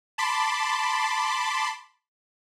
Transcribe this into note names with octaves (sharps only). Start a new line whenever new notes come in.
A5 B5 C6 D6